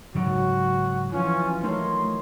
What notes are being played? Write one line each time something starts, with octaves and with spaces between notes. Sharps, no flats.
G#2 C#3 F#3 F#4
E3 F3 C#4 F4
A3 D#4 A#4 C#5 C6